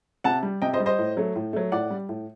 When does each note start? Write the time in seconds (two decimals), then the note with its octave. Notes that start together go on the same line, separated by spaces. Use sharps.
0.24 C3 F#5 A5
0.43 G3
0.62 C3 D#5 G5
0.73 C5 D#5
0.80 G3
0.86 C5 D#5
0.99 A2
1.17 F#3 A3
1.36 A2
1.53 F#3 A3
1.72 A2 D5 F#5
1.90 G3
2.09 A2